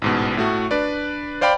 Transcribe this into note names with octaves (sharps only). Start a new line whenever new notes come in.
A1 G#2 B2
A2 A3 F#4
D4 B4 D5
C5 D5 F5 G5 B5 D6